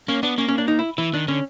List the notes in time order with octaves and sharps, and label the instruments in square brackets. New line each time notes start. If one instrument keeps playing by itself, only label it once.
[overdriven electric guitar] A#3 [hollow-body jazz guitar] C#4
[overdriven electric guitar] B3 [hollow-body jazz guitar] D4
[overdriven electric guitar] A#3 [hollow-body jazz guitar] C#4
[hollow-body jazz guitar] C#4
D4
D#4
E4
[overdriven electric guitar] E3 [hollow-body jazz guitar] E4
[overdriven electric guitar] D#3 [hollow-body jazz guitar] D4
[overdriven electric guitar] D3 [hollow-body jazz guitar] C#4